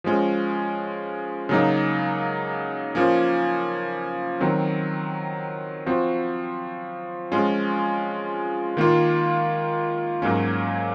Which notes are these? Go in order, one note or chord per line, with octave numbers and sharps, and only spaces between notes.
F3 G#3 C#4
C#3 F#3 A#3 D#4
F3 A#3 C#4
D#3 F#3 C4
F3 C4 F#4
F3 G#3 C#4 F4
D#3 A#3 F4
G#2 F#3 A#3 C#4